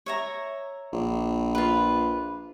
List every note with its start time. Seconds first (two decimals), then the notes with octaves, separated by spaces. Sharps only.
0.06 C#5 E5 A#5
0.93 A#1
1.55 F4 B4